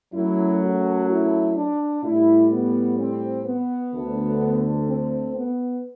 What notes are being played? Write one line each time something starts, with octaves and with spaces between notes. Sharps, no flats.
F#2 F#3 A3 E4
F#4
E4
D4
A2 G3 E4
B3
C4
B3
D2 D3 A3
C4
B3